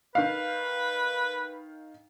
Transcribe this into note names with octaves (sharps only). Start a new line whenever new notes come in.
D#3 B4 F5